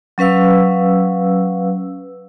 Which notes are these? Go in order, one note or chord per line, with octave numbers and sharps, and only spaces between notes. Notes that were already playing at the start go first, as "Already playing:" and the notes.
F#3 C#4 B4 F5 E6